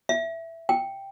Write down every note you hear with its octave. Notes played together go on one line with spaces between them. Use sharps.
E5
G5